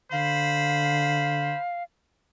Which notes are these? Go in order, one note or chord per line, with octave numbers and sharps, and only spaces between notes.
D3 C5 F5 B5